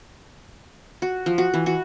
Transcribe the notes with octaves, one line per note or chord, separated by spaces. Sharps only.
F#4
F3
F#4
E3
F#4